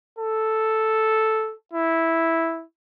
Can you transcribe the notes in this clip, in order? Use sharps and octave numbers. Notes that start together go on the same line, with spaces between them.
A4
E4